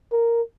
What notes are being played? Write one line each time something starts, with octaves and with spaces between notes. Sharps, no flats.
A#4